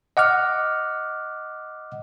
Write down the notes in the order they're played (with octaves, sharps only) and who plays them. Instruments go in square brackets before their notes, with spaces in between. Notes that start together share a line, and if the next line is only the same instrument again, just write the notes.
[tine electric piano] D#5 F#5 D6 F6